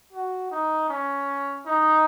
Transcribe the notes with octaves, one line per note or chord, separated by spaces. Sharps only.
F#4
D#4
C#4
D#4